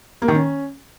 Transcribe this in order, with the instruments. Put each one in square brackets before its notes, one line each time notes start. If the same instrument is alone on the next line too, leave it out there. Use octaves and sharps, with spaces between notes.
[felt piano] A#3
D#3
C#4